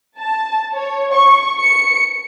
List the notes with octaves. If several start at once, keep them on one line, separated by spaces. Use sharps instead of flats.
A5
C#5
C#6
C#7